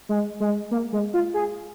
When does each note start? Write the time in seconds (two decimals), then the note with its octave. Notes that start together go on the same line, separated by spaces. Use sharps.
0.09 G#3
0.40 G#3
0.71 A#3
0.93 G#3
1.14 F4
1.34 G#4